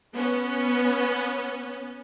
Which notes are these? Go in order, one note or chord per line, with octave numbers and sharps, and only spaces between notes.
B3 C#4